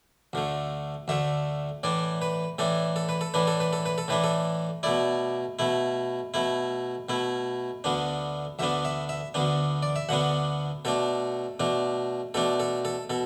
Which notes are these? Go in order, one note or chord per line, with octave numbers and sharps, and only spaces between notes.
D2 D3 A3
D2 D3 A3 E5
A2 E3 D4 D5
B4
A2 E3 D4 A4
A4
B4
A4
A2 E3 D4 B4
A4
B4
A4
B4
A4
A2 E3 D4 B4
A4
B2 A3 E4 D5
B2 A3 E4
B2 A3 E4
B2 A3 E4
D2 D3 B3 D4
D2 D3 B3 D4 E5
E5
E5
D2 D3 B3 D4
D5
E5
D2 D3 B3 D4 F#5
B2 A3 D4 A4
B2 A3 D4
B2 A3 D4 A4
A4
A4
B2 A4